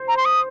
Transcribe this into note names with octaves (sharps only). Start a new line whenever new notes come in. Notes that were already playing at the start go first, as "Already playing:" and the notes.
Already playing: C5
A#5
C6
D#6